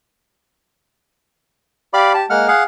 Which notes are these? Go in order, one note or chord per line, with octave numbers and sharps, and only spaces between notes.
G4 D5 F5 B5 D6
G4 A5
G#3 A#3 F#5 F6
G#4 F5 F#5